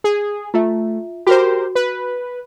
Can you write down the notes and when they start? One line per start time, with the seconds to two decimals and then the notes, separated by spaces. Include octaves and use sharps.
0.04 G#4
0.54 A3 F4 E5
1.27 F#4 G4 A#4 C5
1.75 B4